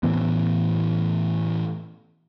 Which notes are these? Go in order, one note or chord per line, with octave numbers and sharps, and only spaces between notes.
A2 E3 B3